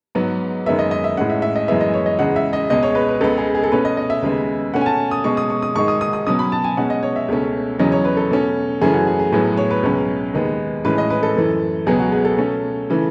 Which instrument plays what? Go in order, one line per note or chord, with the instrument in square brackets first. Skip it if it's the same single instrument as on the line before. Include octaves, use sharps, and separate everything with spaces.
[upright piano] G#2 F#3 B3
F#2 D#3 G#3 B3 E5
D#5
D#5
E5
A2 G#3 C#4 F#5
E5
E5
D#5
F#2 E3 G#3 B3 E5
D#5
C#5
D#5
E2 C#3 G#3 F#5
E5
D#5
C#2 B2 G#3 D#5
C#5
B4
B4
C#2 C#3 G#3 B3 A4
G#4
G#4
A4
B2 A3 C#4 B4
D#5
D#5
E5
D#2 C#3 G#3 B3
B2 A3 C#4 F#5
G#5
A5
D#6
B2 G#3 C#4 C#6
D#6
C#6
D#6
G#2 D#3 G#3 C#6
D#6
D#6
D#6
B2 F#3 C#4 D#6
B5
A5
G#5
B2 G#3 C#4 F#5
D#5
C#5
E5
C#2 B2 A3 C#4
E2 C#3 F#3 C#4 D#5
C#5
B4
A4
B2 A3 C#4
F#2 C#3 E3 A3 C#4 G#4
F#4
G#4
G#4
A2 F#3 B3 G#4
G#4
C#5
B4
C#2 B2 F#3 C#4
D#2 D#3 G#3 B3
A2 E3 G#3 C#4 B4
D#5
B4
A4
F#2 E3 A3
C#2 B2 F#3 B3 G#4
F#4
G#4
A4
B2 A3 C#4
C#3 E3 A3